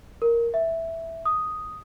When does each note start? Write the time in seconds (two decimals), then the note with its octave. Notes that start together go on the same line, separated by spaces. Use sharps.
0.22 A#4
0.54 E5
1.25 D#6